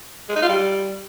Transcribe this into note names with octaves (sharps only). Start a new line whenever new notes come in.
G#3
D#4
F4
G3